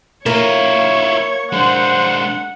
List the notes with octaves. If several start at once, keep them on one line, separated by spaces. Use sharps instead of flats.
A#3 E4 F4 C#5
G#3 D4 C5 F#5